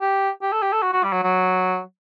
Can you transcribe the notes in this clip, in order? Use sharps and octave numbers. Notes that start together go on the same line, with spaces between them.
G4
G4
A4
G4
A4
F#4
F#4
G3
F#3
F#3